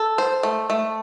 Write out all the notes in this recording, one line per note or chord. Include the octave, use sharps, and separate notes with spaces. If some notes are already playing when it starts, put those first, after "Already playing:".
Already playing: A4
C5
A3
A3